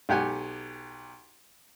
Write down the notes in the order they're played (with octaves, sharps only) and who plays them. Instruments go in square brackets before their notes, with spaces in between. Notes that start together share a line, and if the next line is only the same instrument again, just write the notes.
[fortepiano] B1 G4 F#5 G#5